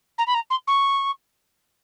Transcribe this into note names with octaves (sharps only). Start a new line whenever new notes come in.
A#5
B5
A#5
C6
C#6